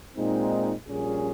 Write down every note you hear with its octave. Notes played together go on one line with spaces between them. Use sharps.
A#2 G#3 C4 D#4
A#1 A#2 G3 C#4 G#4